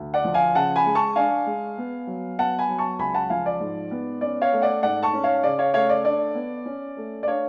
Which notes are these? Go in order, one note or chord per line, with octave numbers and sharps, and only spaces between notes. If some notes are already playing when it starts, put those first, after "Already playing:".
Already playing: D2
D5 F#5
F3
F5 G#5
C#3 F#5 A5
G#5 B5
G#3
A5 C#6
D4 F5 G#5
G#3
B3
F#3
B3 F#5 A5
G#5 B5
F#3
A5 C#6
C#2 G#5 B5
F#5 A5
F3 F5 G#5
D5
G#2
B3
C#4 D5
C#5 F5
A3
D5 F#5
G#2 D5 F#5
A5 C#6
C#4
C#5 F5
C#3 D5
C#5 F5
A3 C#5 F5
D5
D4 D5
B3
C#4
A3
D5
D4 C#5 F5